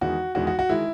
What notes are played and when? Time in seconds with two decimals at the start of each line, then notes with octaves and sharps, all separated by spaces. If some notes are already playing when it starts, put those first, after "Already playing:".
0.01 E2 D#3 G#3 F#4
0.35 E2 D#3 G#3 F#4
0.47 F#4
0.59 F#4
0.69 D#3 G#3 E4